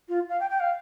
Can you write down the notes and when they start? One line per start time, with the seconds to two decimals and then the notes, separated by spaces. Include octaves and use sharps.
0.08 F4
0.29 F5
0.40 G5
0.50 G5
0.60 F5